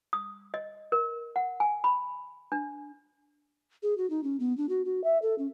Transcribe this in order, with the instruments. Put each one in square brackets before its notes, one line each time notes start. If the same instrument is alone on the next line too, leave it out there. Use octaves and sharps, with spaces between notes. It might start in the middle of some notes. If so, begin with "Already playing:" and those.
[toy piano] D#6
D#5
A#4
F#5
G#5
B5
D4
[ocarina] G#4
F#4
D#4
C#4
B3
D4
F#4
F#4
E5
A4
C#4